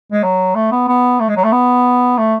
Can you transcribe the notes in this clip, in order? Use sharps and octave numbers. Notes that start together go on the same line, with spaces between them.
G#3
F#3
A3
B3
B3
A3
G#3
F#3
A3
B3
A3